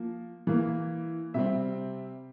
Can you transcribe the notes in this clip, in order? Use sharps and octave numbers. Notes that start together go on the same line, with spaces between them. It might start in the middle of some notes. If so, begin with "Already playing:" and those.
Already playing: F3 A#3
E3 A#3
C3 G3 C4 E5